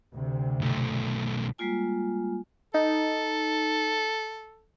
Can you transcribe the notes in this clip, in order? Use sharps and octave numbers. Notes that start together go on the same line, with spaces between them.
D2 C3
B1 A3
G3 G#3 A#3 F4 G#5
D#4 A4